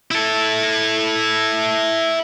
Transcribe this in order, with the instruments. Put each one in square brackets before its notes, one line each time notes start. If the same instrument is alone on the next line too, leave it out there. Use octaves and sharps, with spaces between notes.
[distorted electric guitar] E4 A4